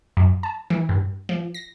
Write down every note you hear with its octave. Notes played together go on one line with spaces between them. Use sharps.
F#2
A5
E3
G2
F3
A#6